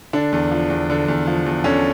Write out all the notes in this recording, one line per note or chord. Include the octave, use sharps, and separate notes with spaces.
D3 D4
E2
F3
E2
D3
E2
F3
E2
D3 C#4